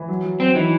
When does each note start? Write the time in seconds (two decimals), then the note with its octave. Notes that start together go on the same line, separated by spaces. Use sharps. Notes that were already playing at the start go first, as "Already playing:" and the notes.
Already playing: E3
0.08 F#3
0.24 F#3
0.40 F#3 C4
0.55 D#3 E3